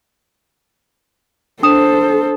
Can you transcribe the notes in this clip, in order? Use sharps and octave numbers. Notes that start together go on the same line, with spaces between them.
D4 A4 C5 D#6 E7